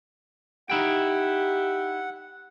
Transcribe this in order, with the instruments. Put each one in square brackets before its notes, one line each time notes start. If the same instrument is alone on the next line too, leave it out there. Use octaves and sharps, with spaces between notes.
[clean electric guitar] D#4 E4 G5 [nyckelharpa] G4 [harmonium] F#5